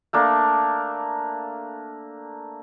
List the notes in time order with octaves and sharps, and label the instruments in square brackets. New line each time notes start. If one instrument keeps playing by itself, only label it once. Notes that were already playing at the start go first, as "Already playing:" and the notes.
[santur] A3 A#3 D4